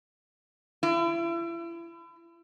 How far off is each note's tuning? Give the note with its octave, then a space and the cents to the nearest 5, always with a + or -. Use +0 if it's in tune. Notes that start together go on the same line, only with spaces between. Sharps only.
E4 +35